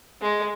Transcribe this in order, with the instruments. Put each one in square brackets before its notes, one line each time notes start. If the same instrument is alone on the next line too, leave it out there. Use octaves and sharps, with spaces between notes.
[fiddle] G#3